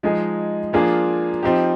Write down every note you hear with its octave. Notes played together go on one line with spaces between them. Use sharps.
F3 G#3 D#4 G#4
F3 A#3 D4 F4 G#4
F3 C4 D#4 G4